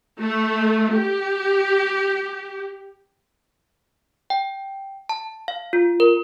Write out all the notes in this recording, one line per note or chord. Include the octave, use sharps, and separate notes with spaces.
A3
G4
G5
A5
F5
F4
A#4